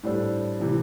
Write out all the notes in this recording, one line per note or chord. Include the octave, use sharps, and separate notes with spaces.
A2 G3 D4 A4 C5
C3 E3 A#3